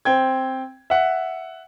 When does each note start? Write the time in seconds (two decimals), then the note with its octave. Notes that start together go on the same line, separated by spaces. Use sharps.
0.05 C4 G5 G#6
0.90 E5 F#5